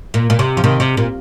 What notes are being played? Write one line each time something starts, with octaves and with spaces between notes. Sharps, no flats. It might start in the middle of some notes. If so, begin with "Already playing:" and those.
A#2
A#2
C3
F3
C3 D#3
C3
A#2